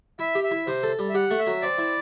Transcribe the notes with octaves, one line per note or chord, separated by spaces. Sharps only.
E4 E5
G4
E5
E4
C3 C5
A4
G3
E5
G4 F#5
A3
E5
F#3
C4 D5
E4